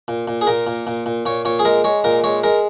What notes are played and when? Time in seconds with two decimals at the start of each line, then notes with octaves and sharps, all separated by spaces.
0.08 A#2
0.28 A#2
0.41 G#4
0.47 A#2 A#4
0.67 A#2
0.87 A#2
1.06 A#2
1.26 A#2 C#5
1.45 A#2 C#5
1.59 G#4
1.65 G#3 A#4
1.84 G#3 C#5
2.04 A#2 A#4
2.24 G#3 C#5
2.44 G#3 A#4